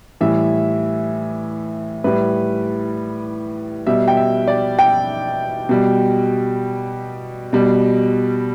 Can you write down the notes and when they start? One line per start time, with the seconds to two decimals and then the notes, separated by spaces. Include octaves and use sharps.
0.21 A2 E3 G3 E5
2.04 A2 G3 B4
3.87 B2 G3 E5
4.08 G5
4.17 E5
4.48 D5
4.79 G5
5.69 B2 G3
7.53 B2 G3